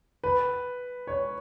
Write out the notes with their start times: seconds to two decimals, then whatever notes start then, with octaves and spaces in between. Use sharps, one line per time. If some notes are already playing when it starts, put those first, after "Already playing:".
0.24 B4
1.07 C#5